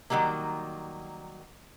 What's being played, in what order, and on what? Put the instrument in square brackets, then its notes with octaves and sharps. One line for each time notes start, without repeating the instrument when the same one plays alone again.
[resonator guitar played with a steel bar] D#3 E3 F#3 G3 A#3